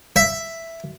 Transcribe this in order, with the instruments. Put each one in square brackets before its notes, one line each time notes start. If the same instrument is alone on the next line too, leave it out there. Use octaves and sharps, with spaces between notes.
[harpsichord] E5